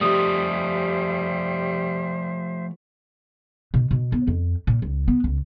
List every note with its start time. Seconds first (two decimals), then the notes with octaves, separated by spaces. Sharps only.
0.01 F3 G3 A3 G4 C5 E5 D#6
3.74 B2
3.91 B2
4.12 B3
4.27 F2
4.67 A#2
4.82 C#2
5.08 B3
5.24 C#2